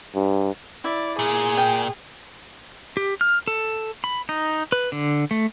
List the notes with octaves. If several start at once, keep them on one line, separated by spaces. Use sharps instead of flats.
G2
E4 D5
A#2 G#4
G5
G4
F6
A4
B5
D#4
B4
D3
A3